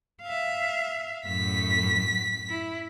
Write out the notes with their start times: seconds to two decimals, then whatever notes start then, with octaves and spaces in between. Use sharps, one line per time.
0.23 E5 F5
1.26 F#2 A2 B6
2.49 E4